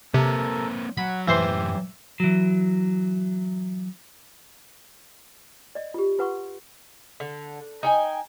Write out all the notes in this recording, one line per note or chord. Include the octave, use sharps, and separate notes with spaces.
C3 A#3 C4 A4 A#4
F#3 F#5 B5
F#2 A2 E3 G4 C5 C6
E3 F#3
D5 D#5
F4 G4
F4 B4 F#5 C6 C#6
D3
D#4 G5 G#5